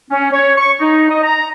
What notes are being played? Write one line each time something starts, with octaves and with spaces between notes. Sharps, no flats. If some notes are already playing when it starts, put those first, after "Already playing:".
C#4
C#5
C#6
D#4
D#5
A#5